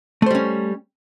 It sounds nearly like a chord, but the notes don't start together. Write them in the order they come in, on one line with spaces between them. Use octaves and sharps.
A3 C5 G3 C#4